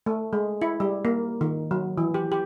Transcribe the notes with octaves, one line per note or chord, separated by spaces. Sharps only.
A3
G#3
E4
G3
A#3
D#3
F#3
E3
G4
G4